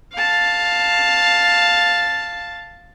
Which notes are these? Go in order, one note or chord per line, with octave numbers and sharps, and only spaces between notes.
F5 A5